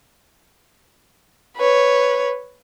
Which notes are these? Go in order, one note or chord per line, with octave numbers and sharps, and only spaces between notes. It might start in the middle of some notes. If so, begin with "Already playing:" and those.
B4 C#5